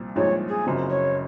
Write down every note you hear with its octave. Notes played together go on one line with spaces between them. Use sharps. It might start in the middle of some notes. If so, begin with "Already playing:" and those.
Already playing: C2 A#2 F3
C2 A#2 F3 G#3 D#4 C#5
G#4
F#1 F#2 C#3 F3 C4
C#5